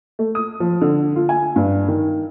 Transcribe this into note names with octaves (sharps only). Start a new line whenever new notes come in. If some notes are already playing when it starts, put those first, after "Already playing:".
A3
D#6
F3
D3
F4
G#5
G2
D#3